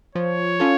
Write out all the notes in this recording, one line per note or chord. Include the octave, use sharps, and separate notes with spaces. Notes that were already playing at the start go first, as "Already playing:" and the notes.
F3 C#5
C#4 F4 A4